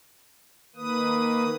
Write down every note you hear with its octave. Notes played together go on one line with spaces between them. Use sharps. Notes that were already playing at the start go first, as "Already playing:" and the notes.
D#3 A#3 B4 D#6